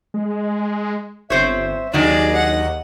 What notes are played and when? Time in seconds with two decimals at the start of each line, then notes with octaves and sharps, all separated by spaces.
0.14 G#3
1.30 G1 C4 C5 C#5 E5
1.93 D#2 D#3 F#3 D4 G#4 D5 D#5
2.35 F#5